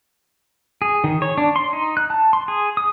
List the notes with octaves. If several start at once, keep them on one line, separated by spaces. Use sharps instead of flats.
G#4
D#3
C#5
D4
C6
D#4
F#6
A5
C6
G#4
D#6